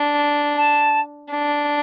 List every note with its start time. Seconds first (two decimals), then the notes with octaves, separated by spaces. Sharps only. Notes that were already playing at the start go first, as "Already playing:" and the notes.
Already playing: D4
0.57 A5
1.31 D4